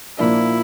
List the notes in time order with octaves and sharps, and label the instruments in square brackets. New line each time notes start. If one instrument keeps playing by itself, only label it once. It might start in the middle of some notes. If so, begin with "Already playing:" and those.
[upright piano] A#2 F3 A#3 D4 [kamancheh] E4